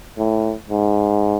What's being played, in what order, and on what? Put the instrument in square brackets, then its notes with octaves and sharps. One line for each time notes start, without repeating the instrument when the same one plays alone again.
[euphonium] A2
G#2